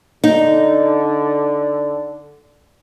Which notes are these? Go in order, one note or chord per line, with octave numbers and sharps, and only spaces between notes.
D3 D#4